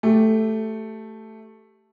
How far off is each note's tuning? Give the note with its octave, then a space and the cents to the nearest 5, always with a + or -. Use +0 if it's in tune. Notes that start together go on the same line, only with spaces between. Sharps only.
A3 +0 G4 -10